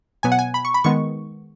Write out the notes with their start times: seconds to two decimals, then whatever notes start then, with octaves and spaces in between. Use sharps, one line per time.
0.23 B2 F#3 B3 G#5
0.32 F#5
0.39 G#5
0.54 B5
0.65 C#6
0.74 B5
0.84 D#3 G#3 B3 C#6